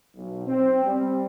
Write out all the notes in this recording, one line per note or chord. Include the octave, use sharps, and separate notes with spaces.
B1
C4
G3